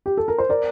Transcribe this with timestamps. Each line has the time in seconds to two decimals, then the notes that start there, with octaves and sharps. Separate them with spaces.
0.06 G4
0.17 A4
0.28 A#4
0.38 C5
0.49 A#4 D5